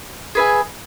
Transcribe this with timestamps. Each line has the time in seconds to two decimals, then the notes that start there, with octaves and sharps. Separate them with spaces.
0.35 G#4 B4 E5 G#5